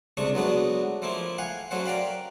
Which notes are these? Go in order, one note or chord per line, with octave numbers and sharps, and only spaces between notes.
C#2 C3 A3 D4 C#6 D#6
F#3 G#3 A3 B3 D4 F#4
F3 A3 A#3 E4 F4
F5 F#5 G#5
F#3 A3 C#4 C5 F#5
A#4 D5 F5 G5 B5